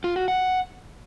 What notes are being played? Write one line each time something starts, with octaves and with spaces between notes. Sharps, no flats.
F4
F#4
F#5